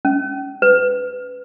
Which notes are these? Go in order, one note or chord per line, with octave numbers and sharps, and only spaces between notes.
C#4
B4